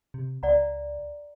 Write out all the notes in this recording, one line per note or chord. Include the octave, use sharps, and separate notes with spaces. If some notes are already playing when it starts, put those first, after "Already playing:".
C3
C#2 D5 F#5 A#5